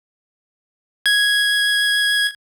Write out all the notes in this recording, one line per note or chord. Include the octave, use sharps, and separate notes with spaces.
G#6